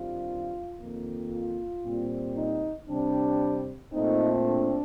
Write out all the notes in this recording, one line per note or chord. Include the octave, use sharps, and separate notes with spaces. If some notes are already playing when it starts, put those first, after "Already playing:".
Already playing: G2 D#3 G3 C4 F4
F2 D#3 A#3
F4
A#2 G3 C4
D#4
C3 G3 C4 D4
A#2 A3 C4 D#4
D4